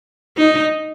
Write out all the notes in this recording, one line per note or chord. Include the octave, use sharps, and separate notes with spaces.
D#4